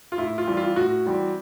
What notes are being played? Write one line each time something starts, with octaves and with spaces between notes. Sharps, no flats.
F4
A2 E4
F4
E3 G3 C4
F4
A2 F#4
E3 G3 C4